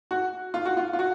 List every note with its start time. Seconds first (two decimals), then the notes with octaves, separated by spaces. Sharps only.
0.11 F#4
0.54 F4
0.65 F#4
0.77 F4
0.93 F4
0.99 F#4